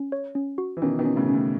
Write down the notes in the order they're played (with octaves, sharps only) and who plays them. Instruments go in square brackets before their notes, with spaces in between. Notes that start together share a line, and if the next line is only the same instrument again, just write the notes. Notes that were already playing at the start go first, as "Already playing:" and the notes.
Already playing: [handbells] C#4
C#5
C#4
F#4
[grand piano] E3
[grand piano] B2 D#3 [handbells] C#4
[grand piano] B2 D#3
[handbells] C#4
[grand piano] A2 C#3
[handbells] C#4
[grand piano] A2